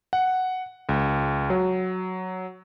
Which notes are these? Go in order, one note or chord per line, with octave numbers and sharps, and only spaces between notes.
F#5
C#2
F#3